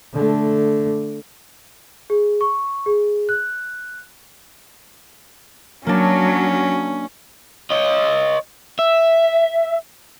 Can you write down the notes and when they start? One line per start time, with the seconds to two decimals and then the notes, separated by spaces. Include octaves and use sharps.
0.14 D3 A3
2.10 G#4
2.41 C#6
2.86 G#4
3.29 F#6
5.86 F#3 A#3 C#4 D4
7.72 C#5 D#5
8.79 E5